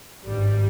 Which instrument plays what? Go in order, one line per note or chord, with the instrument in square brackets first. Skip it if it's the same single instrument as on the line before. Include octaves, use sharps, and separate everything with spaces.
[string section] G#1 G2 G3